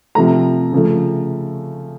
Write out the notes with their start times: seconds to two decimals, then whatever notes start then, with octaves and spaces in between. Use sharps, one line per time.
0.15 C3 F3 A3 A#5
0.72 C#3 F3 A3